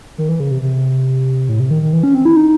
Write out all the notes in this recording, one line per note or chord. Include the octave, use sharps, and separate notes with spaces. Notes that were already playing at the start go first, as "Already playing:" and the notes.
D#3
E3
C#3
C3
C3
A2
C3
D#3
D#3
E3
C#4
C4
E4
D#4